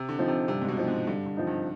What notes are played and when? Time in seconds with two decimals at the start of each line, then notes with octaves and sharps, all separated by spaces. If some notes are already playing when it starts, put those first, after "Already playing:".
Already playing: C3
0.09 D3
0.19 F3 C4 D#4
0.28 C3
0.48 G2 C3
0.62 G#2
0.68 B2
0.78 F3 C4 D#4
0.88 G#2
1.07 G2 D3
1.26 D3
1.37 F3 C4 D#4
1.47 G2